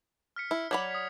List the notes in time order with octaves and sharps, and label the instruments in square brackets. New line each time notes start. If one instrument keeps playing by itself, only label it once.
[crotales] F6 B6 C#7
[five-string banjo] E4
[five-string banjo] F#3 D5 B5 [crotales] G#6 B6 F7
[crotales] D#6 B6